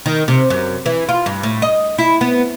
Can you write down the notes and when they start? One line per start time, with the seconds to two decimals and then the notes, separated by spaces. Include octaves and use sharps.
0.06 D#3
0.28 C3
0.50 F#2
0.86 E3
1.09 F4
1.26 G2
1.43 A2
1.62 D#5
1.98 E4
2.21 B3